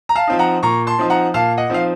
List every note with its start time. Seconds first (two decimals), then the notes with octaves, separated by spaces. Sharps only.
0.09 A#5
0.15 F5 A5
0.27 F3 C4 D#4
0.39 F#5 A#5
0.63 A#2 A#5 C#6
0.87 A5 C6
0.99 F3 C4 D#4
1.10 F#5 A#5
1.34 A#2 F5 A5
1.57 D#5 F#5
1.70 F3 C4 D#4 F5